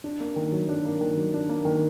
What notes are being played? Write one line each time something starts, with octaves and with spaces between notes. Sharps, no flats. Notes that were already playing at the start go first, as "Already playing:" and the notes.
D4
A#3
D#3
F#3
D4
A#3
D#3
F#3
D4
A#3
D#3